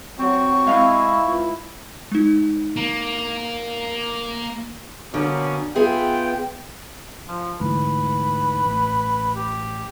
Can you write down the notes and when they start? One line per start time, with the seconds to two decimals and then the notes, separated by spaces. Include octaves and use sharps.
0.19 F#3 C4 C#6
0.67 G#3 C4 C#4 E4 F5
1.22 C#2
2.12 G#3 D#4
2.76 A#3
5.14 B2 D3 A#3 C#4
5.75 B3 F4 G#4 E5 G5
7.28 F3
7.60 D2 G#2 E3 B4
8.65 A1
9.35 G4